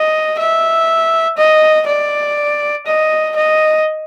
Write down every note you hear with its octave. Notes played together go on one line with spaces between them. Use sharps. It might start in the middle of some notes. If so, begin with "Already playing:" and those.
Already playing: D#5
E5
D#5
D5
D#5
D#5